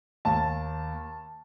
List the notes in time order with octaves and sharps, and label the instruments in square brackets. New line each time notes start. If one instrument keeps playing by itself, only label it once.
[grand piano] D#2 A5